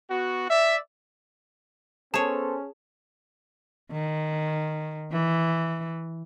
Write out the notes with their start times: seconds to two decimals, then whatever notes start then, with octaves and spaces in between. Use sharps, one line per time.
0.10 B3 F#4
0.49 D5 E5
2.14 B3 C#4 G#4 A4 C5 C#5 A5
3.91 D#3
5.11 E3